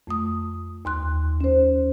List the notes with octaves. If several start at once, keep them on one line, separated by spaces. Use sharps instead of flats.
F2 A3 D#6
D#2 C6 F#6
C#4 C5